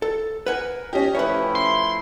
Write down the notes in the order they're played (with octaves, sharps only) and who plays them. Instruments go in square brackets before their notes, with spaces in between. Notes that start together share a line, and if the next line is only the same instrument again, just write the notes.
[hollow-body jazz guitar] A4
[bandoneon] A#4 [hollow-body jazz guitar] B4 F#5 G#5
[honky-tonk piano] C#4 G4 [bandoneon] D#5
[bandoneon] F3 A3 E4 [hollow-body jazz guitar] B4 C#5
[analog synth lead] C6